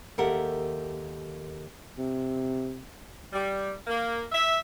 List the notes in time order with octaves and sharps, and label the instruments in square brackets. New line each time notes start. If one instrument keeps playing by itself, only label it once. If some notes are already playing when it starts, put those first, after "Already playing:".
[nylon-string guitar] D#2 G4 A4 A#4 E5 F#5
[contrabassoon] C3
[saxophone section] G3
A#3
E5